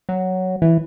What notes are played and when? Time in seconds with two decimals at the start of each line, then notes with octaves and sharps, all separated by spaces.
0.09 F#3
0.62 E3